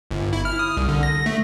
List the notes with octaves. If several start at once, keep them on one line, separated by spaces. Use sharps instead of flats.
G1
E4
F6
D#6
C2
D3
A#6
A3